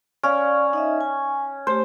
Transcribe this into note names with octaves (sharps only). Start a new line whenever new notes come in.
C#4 D5 F5
D#4 D#5 E5
G#5
A3 G4 C5